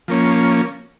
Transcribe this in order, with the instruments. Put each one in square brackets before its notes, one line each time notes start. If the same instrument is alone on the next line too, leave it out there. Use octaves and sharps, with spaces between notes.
[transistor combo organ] F3 A#3 C#4